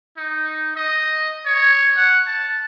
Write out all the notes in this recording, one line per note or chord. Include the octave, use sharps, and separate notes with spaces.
D#4
D#5
C#5
F#5
A5